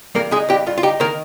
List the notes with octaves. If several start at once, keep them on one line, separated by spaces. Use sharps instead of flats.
G2 A#3 A#4
G#3 D#4 G#4
G2 G4
G2 F4
F4
D#4 G4
D#3 A#3 A#4